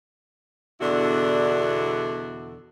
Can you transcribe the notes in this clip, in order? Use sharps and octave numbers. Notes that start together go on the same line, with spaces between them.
E2 B2 D3 D4 E4 F#4